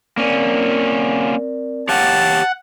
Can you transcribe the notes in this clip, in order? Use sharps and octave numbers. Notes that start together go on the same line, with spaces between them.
A#3 C4 C#4 A#4 D5
G4 C#5 F5 F#5 A5